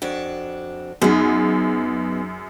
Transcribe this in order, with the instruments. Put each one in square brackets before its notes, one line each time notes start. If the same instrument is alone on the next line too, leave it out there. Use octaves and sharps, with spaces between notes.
[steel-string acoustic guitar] F2 D4 F#4
[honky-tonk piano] F#2 G#4 [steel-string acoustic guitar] B3 D#4